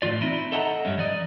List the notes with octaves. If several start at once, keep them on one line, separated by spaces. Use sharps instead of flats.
A2 E3 F4 D5
C4 D#4 E4
A4 D#5 E5 F#5 A5 A#5
G2 G3 C#4
E3 D5 D#5